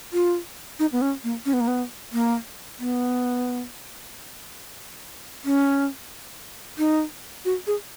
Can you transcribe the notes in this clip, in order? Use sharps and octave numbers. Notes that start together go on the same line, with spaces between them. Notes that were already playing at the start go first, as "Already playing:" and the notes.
F4
D#4
B3
C#4
A#3
C#4
B3
A#3
B3
A#3
B3
C#4
D#4
F#4
G#4